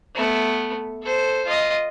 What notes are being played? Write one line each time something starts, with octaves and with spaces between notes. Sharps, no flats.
A3 B3
A4 C5
F4 D#5